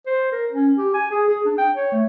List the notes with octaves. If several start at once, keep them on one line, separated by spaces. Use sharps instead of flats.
C5
A#4
C#4
G4
G#5
G#4
G#4
D4
G5
C#5
A3